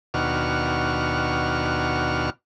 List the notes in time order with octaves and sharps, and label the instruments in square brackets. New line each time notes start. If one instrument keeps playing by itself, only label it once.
[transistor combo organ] D#2 B2 D4 F#4 C#6 F6